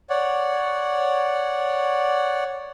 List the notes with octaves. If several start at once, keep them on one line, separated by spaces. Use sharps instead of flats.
C#5 D5 F#5